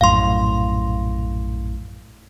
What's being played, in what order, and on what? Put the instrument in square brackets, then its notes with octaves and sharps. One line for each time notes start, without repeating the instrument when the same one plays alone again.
[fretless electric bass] A#1 F#2 A2 [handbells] F5 C6